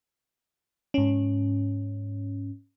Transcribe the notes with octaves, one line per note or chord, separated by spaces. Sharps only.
G#2 C#4